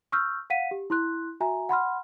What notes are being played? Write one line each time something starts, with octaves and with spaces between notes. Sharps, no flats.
C#6 E6 F6 G6
F5 F#5 B6 D#7
G4
E4 C6 F#6
F#4 E5 G#5 A#5
F#5 B5 C6 F6